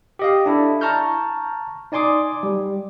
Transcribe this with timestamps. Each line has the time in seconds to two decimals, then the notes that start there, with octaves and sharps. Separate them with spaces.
0.19 G4 D#5 F5
0.46 D4 E4 A4
0.81 A5 A#5 C#6 F6 G6
1.92 D#4 D5 G#5 C6 D6 D#6
2.43 G3